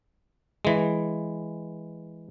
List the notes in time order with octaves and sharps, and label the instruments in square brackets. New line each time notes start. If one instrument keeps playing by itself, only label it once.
[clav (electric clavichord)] E3 G#3